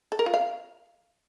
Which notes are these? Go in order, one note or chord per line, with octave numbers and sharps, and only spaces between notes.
A4
A#4
F4
F5